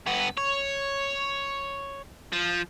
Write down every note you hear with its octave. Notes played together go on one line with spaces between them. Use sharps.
G2 B3
C#5
F3